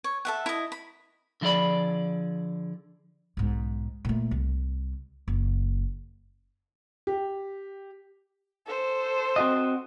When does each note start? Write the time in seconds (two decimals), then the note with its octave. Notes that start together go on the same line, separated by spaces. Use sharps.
0.04 C#5
0.25 A4 E5 F#5
0.46 E4 D#5
0.72 B5
1.41 D3 F3 E4 G#4 D5 B5
3.37 B1 G#2
4.05 A#2 A3
4.31 C2
5.28 F#1
7.07 G4
8.67 A4 C5
9.36 C4 F#4 D#5